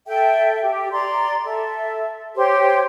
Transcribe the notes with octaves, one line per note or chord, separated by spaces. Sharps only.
A4 E5 G5
G4
D5 A#5 C6
A4 E5
G4 C5 C#5 C6